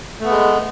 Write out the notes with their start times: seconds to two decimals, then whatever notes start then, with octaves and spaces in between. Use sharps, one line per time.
0.20 A3
0.25 B3
0.30 G#3